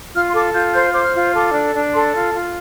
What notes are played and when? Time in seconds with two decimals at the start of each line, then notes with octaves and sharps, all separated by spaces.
0.15 F4 F6
0.28 C6
0.34 A4 D6
0.54 F4 G6
0.74 C5 G6
0.93 C5 D6
1.04 F6
1.15 F4
1.35 A4 D6
1.54 D4
1.74 D4
1.93 A4 C6
2.14 F4
2.34 F4